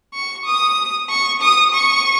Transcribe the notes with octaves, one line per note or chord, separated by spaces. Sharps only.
C#6
D#6
C#6
D#6
C#6